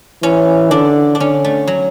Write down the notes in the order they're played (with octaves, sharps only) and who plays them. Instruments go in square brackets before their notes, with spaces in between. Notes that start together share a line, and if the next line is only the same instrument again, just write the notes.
[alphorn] E3 [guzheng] C#4
[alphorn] D3 [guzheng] D4
[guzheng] D4
[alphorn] D3 [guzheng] C#4
[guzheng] A3
F#3